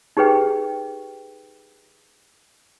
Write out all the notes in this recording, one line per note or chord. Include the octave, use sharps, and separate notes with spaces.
D#4 G4 G#4 B4 G5